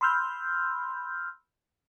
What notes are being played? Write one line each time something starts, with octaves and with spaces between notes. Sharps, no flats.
B5 C6 E6 F6 G6